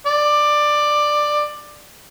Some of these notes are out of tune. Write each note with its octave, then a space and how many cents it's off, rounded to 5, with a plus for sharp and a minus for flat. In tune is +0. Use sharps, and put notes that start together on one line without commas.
D5 +15